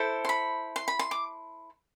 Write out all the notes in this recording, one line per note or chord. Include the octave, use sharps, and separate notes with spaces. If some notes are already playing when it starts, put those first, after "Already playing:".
Already playing: E4 A4 C5
C6
B5
C6
B5
C6
D6